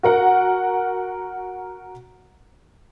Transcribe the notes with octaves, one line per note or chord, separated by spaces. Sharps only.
F#4 A#4 F#5